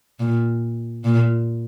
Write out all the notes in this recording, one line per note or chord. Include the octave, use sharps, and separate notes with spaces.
A#2
A#2